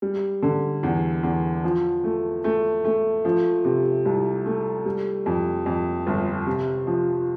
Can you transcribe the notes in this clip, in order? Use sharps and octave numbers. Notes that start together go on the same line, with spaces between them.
G3
D3
E2
E2
F3
A3
A3
A3
F3
C3
C2
A3
G3
F2
F2
G1
C3
F3